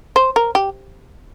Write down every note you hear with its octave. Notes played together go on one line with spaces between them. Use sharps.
C5
A#4
G4